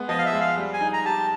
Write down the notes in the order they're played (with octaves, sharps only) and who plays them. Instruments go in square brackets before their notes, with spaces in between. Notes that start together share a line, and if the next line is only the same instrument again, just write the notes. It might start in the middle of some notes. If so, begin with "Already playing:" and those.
Already playing: [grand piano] G#3 B3
[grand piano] F3 [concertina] D#5
[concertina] F5
E5
[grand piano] G#3
[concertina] F5
[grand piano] G3
[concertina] G#5
[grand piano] D#4
[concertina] A#5
[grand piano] G4 [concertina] A5